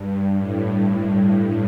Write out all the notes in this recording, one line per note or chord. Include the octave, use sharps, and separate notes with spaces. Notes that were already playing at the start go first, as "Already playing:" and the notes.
Already playing: G2
A2